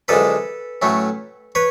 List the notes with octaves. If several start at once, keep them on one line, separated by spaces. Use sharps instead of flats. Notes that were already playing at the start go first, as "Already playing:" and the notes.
F#2 D3 F3 G#3 A4 B4
A2 F#3 A3 C#4
B4 C#5